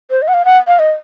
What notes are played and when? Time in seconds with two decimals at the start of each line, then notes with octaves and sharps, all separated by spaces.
0.11 C5
0.22 D#5
0.28 F#5
0.34 F5
0.45 F#5
0.68 F5
0.79 D#5